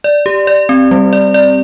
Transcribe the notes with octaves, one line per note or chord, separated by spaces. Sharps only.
D5
G4
D5
C4
G3
D5
D5